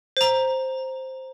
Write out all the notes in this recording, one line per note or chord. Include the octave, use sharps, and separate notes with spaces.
C5 A#5